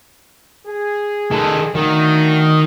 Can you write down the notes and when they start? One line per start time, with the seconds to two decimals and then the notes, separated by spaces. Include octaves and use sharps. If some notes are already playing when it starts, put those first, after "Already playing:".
0.67 G#4
1.31 D#3 A4
1.75 D3 D#3 A3 F#4